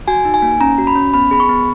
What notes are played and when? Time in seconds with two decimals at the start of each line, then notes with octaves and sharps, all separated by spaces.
0.08 F#4 G#5
0.25 D#4
0.34 G#5
0.42 A#3
0.61 C#4 A#5
0.78 F#4
0.87 B5
0.96 C#4
1.14 B3 B5
1.31 G#4 B5
1.40 C#6
1.49 B3